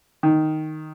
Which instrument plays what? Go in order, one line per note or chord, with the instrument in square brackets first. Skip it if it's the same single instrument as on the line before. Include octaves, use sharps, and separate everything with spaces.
[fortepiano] D#3